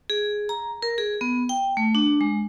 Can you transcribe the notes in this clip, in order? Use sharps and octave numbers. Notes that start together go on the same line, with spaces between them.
G#4
A#5
A#4
G#4
B3
G5
A3
D4
G#3